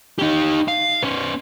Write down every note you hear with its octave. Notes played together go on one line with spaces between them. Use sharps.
D#4 G4
F5
B3 C#4